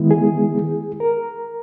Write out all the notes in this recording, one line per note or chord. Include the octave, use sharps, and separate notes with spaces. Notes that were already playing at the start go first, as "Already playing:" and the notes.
Already playing: D#3 G#3 B3 E4
G#4
A#4